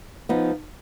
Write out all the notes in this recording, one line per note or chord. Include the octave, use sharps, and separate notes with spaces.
F3 B3 D#4